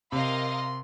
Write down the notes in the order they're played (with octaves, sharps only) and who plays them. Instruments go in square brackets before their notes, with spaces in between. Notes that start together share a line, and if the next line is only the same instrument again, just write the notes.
[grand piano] C3 [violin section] A#4 D#5 F5 [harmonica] C6